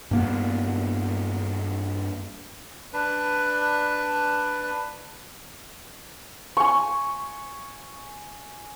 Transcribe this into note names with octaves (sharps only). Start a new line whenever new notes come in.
G2 A#3 B3
D4 B4
G#5 C#6